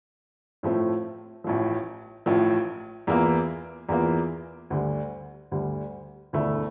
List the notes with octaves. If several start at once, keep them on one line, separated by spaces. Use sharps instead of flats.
A2 F3 A3 C4
A1 A2 F3
A1 A2 F3
E2 E3 A#3 F4
E2 E3 A#3 F4
D2 D3 G3
D2 D3 G3
E1 D2 D3 A3 E4